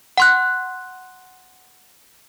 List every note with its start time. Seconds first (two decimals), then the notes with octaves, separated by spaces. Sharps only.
0.18 F#5 C6 F#6